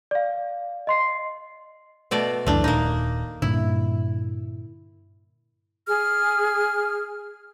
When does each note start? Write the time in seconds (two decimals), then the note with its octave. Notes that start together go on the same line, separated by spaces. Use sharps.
0.11 D5 F5
0.87 D#5 C6 C7
2.11 B2 A3 D5
2.47 C#2 F#2 E3 A3 D4
2.64 D#1 A#3 D#4
3.42 G2 A#2 D3 E4
5.88 G#4 F6